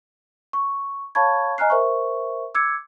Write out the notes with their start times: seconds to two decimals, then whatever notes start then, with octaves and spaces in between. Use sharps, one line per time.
0.53 C#6
1.15 C#5 F5 A5 B5 C#6 G#6
1.58 D#5 G#5 A#5 F6 F#6 C7
1.70 A#4 C5 E5 C#6
2.55 D6 E6 G#6 C#7